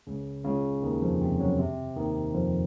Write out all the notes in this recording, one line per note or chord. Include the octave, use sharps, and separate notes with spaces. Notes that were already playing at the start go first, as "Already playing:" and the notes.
C#2 C#3
C#2 C#3
D#2 D#3
F2 F3
C3 C4
F#2 F#3
C3
D#2 D#3
F2 F3